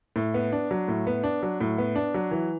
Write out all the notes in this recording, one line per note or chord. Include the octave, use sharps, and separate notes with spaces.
A2
B3
D4
F#3
A2
B3
D4
F#3
A2
B3
D4
F#3
E3